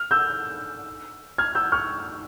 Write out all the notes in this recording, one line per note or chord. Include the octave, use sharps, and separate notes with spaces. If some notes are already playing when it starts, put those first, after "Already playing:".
Already playing: F6
E6 G6
F6 G#6
E6 G6
C#6 F6